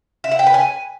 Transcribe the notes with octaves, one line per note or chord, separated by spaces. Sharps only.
E5
F#5
G5
B4
G#5